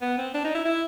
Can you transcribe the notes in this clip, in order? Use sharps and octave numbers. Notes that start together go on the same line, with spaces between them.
B3
C4
D4
D#4
E4
E4